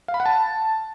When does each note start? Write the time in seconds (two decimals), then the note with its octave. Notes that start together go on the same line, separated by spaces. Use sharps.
0.08 F5
0.14 B5
0.20 F#5
0.26 A5